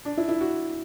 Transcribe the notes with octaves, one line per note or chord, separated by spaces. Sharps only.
D4
E4
E4
F#4